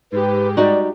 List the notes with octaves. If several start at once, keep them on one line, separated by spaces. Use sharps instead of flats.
G#2 G4 B4
G3 D#4 F#4 D5